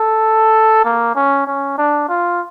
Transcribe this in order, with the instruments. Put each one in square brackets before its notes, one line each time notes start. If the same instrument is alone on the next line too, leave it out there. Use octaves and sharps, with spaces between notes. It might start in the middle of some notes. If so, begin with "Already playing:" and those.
Already playing: [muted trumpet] A4
A#3
C#4
C#4
D4
F4